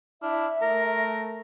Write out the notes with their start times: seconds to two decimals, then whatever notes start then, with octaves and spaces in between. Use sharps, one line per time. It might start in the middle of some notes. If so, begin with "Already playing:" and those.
0.22 D4 E4 E5 F6
0.62 A3 A#4 A#6